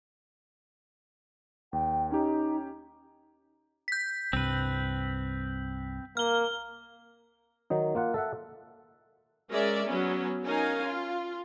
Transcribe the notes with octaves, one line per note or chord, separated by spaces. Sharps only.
D#2 G5
C#4 D#4 G4
G6 B6
C2 G2 C3 C4 B4
A#3 F6 G7
D#3 F#3 D#4
A#3 F4 F#5
A4 E5 F#5
G#3 C#4 A#4 D5 E5
F#3 B3 C#4
C#4 D#4 A#4 F5 G#5
F4